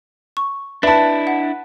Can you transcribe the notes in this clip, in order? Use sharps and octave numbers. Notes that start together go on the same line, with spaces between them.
C#6
D4 E4 B4 E5 A5
F#5